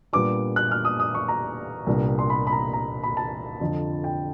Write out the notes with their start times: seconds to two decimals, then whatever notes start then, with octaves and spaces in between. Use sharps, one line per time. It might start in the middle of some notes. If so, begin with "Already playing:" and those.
0.13 A#2 G3 B3 D4 D6
0.56 F#6
0.71 F6
0.85 D#6
1.00 D#6
1.15 C#6
1.28 A#5
1.86 C2 A#2 G3 B3 D4
2.19 C6
2.30 B5
2.47 B5
2.52 A#5
2.73 A#5
3.03 B5
3.17 A5
3.60 F2 D3 F3
4.04 G5